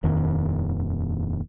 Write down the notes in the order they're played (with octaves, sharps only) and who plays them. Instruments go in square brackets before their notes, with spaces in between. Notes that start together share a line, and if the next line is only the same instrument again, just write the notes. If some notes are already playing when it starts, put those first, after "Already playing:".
[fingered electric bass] D#1 F2 D#3